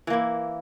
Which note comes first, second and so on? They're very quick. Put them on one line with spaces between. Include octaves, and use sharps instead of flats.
E3 A#3 E4